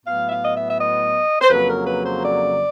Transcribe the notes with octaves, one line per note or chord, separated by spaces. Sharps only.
A2 F#3 B3 F5
E5
F5
D#5
E5
E5
D#5
C5
F2 C#3 F#3 A#3 B4
A#4
B4
C5
D5